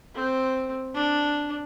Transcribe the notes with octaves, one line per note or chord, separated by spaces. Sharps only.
C4
D4